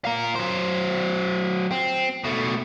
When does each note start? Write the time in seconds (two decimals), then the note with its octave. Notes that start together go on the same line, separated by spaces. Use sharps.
0.05 F4 A#4
0.35 F#3 C5
1.71 C4
2.24 B2 A3